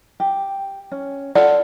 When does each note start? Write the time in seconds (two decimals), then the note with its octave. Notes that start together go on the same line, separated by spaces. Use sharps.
0.20 G4
0.91 C#4
1.35 F4 A4 D5 F#5